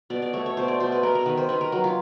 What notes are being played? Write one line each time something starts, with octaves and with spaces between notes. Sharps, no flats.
B2 D5
D5
A3 C#5
C#5
B2 C5
D5
B2 C5
B4
B3 A#4
A#4
D#3 B4
C5
D#3 B4
A#4
F#3 B4
F4